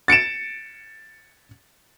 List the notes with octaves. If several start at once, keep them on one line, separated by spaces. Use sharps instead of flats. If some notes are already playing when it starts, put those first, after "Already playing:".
A6 C#7 D7 E7